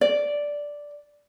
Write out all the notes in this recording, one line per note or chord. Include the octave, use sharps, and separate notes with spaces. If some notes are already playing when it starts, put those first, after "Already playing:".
D5